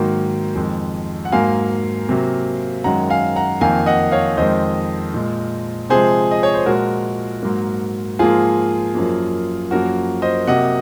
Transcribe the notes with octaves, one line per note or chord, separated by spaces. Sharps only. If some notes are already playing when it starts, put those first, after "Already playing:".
Already playing: G#2 D#3 F#3 A#3
F2 D#3 G#3
F#5
G#2 F#3 A#3 F5 G#5
C3 F#3 A#3
F#2 D#3 G#3 F#5 A#5
F5 G#5
F#5 A#5
F2 D#3 A#3 F5 G#5
D#5 F#5
C#5 F5
F2 D#3 G#3 C5 D#5
A#2 G#3
C3 F3 G#3 G#4 C5
D#5
C#5
C5
A#2 F3 G#3 F#4 A#4
G#2 F#3 A#3
G#2 F3 A#3 F4 G#4
F#2 F3 A#3
F#2 F3 A#3 F#4 A#4
C5 D#5
C3 F#3 A#3 D#5 F#5